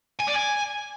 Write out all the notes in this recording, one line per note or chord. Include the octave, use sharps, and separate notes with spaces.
G#5
D5
G#5